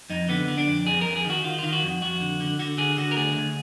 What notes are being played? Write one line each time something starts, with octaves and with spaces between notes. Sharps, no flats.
F2 D#4
D3 B3
D3
D4
F2
F2 G#4
F2 A#4
G#4
D#3 F#4
D#3 F4
D#3 F4
F#4
F2
F2 F#4
D3
D3
D3 F#4
D3 G#4
D3 F#4
A#4
D2 G#4
D2